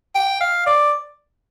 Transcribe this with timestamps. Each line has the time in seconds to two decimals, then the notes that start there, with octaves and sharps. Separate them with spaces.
0.15 G5
0.41 F5
0.66 D5